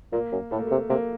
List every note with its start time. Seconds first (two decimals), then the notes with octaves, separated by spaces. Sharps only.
0.13 A#2 A#3
0.32 F#2
0.51 A2 A3
0.59 A#3
0.67 C3 A3
0.89 C3 A#3